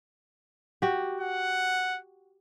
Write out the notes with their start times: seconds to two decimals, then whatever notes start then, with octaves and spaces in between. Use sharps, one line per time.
0.82 F#4 G4
1.21 F#5